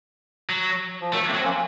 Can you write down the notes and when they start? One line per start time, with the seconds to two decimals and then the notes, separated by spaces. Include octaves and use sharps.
0.49 F#3
1.01 F3
1.12 D#3 F#3 A3
1.28 A3 C4
1.34 F#3
1.39 C4
1.44 A#3 C#4